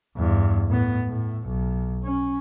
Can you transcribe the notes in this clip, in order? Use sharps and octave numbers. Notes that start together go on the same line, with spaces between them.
E2 G2
A2 B3
A2
B1
C#4